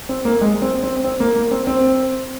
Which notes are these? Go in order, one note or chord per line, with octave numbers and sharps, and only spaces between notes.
C4
A#3
G#3
C4
C4
C4
A#3
A#3
C4
C4